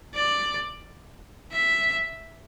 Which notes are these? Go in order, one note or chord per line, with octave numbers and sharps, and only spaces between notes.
D5
E5